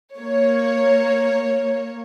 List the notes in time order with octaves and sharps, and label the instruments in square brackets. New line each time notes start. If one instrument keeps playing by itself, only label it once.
[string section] A#3 C#5